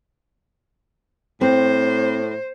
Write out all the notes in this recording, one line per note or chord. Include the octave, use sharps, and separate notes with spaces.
A2 C4 C5